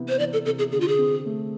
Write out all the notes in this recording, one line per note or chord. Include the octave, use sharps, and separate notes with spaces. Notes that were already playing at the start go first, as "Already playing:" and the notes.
Already playing: C3 E3 B3 E4
C5
E3 D5
A4
C3 A4
G#4
D3 G#4
F4
G#4
C4
A3